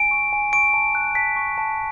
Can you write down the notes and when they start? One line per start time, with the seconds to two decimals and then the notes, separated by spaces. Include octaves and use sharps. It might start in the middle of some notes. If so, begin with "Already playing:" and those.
Already playing: G#5 D7
0.11 C#6
0.33 G#5
0.53 C#6 D7
0.74 A5
0.95 F#6
1.15 A5 B6
1.36 C#6
1.58 A5